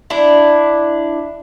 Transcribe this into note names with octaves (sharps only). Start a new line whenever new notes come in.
D4 E4